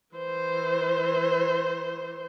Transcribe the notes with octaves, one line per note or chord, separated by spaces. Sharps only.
E3 C5